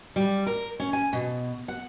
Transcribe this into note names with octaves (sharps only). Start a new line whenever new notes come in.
G3
A#4
C#4
G#5
B2
F#5